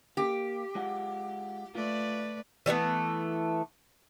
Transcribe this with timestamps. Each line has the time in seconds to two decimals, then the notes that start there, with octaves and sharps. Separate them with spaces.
0.17 A#3 G4
0.75 G#3 F4 F#5
1.75 A3 F4 B4 D5
2.66 E3 G3 A3 B3